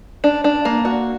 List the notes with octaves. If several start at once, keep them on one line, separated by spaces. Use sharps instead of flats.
D4
D4
A#3
F#4